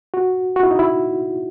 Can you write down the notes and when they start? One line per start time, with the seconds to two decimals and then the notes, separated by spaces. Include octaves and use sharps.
0.14 F#4
0.56 F#4
0.63 E4
0.71 D#4
0.79 E4